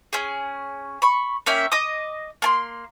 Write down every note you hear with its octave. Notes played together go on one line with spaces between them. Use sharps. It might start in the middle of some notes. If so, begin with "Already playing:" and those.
C#4 G#4
B5 C#6
A#3 C#4 E5 G5
D#5 D6 D#6
A#3 A5 C6